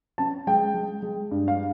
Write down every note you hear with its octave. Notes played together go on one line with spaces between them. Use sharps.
C#4 A5
G#3 G5
G#3
G#3
G2
F5